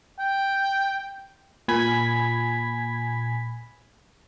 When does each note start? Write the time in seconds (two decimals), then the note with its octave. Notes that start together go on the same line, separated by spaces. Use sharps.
0.19 G5
1.68 A#2 G#5 B5 G#6 B6